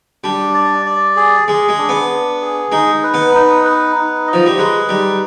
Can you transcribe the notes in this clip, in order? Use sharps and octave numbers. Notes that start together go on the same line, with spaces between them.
G3 D4
D5
D5
G#4
G#3 G#4
G#3
D4
B3
D4
G#4
G#3 D#4
B4
B3
D#4
B4
D#4
D#5
F3
G3
G#3 B4
G3 D#4